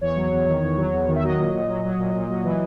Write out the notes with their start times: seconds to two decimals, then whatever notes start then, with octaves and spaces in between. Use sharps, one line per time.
0.01 E2 C#5
0.16 F#3
0.32 E2
0.47 D#3
0.63 E2
0.77 F#3
0.93 E2
1.08 D#3
1.15 E5
1.23 F#3 D#5
1.38 A#2
1.54 A#2
1.68 F#3
1.84 F#3
1.99 A#2
2.15 A#2
2.30 F#3
2.44 E3